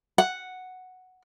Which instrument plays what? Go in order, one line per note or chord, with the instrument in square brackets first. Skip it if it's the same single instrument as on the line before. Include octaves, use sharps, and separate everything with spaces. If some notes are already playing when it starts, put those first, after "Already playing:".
[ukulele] F#5